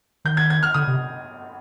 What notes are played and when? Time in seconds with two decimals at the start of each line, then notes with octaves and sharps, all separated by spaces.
0.25 D#3 G6
0.37 G#6
0.50 G#6
0.63 F6
0.74 D3 D#6
0.87 C3